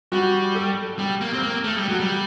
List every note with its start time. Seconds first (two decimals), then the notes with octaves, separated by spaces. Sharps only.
0.12 G3 F#4
0.55 A4
0.99 G3 G4
1.21 A#3
1.33 C4
1.43 A#3
1.64 A3
1.76 G3
1.88 F#3
1.99 G3